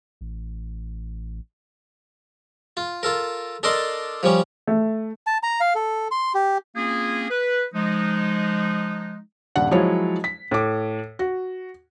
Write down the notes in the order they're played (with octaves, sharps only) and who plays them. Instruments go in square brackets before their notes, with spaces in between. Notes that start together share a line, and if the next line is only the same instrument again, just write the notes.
[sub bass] A1
[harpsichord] F4
F4 A4 A#4
D4 A4 A#4 D5 D#5 C6
F3 G3 C#4
[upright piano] A3
[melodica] A5
A#5
F5
A4
C6
G4
[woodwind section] A#3 C4 C#4 F4 G#4
B4
F3 G#3 D#4
[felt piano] D#1 G2 F#5
F3 F#3 G#3 E4 C#5
B6
A2 D6
F#4